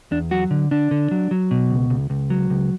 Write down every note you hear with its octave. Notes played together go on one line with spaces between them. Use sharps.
E2 D4
F#3 F#4
D3
D3 D4
D3
F#3
F#3
B2
C#2
C#2
C#2
F#3
C#2